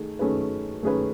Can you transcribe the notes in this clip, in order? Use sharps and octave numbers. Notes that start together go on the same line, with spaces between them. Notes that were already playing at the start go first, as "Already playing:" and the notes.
Already playing: D#3 A3 G#4
D#3 A3 C#4 G#4 B4
D#3 A3 C#4 G#4 B4